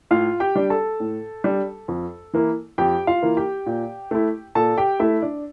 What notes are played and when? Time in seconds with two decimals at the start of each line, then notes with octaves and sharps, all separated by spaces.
0.11 A2 F4 F5
0.40 G4 G5
0.56 G3 D4
0.70 A4 A5
1.00 A2
1.44 G3 D4
1.88 F2
2.33 E3 A#3 E4
2.78 F2 G4 G5
3.07 F4 F5
3.22 E3 A#3 E4
3.37 G4 G5
3.66 A#2
4.11 A3 E4
4.55 A#2 A4 A5
4.78 G4 G5
5.00 A3 E4 E5
5.22 D4 D5